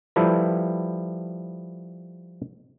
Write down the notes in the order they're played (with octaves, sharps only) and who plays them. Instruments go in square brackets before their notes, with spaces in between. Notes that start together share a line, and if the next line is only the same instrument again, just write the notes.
[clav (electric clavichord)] F3 G3 E4 A4 B4